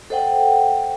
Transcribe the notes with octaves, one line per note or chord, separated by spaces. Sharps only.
A4 C5 D#5 F#5 G5